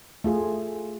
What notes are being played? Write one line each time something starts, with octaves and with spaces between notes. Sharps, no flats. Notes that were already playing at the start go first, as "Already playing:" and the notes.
A3 F4 G#4